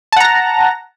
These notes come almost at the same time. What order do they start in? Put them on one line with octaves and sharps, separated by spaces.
A5 F#5 A#5 A#6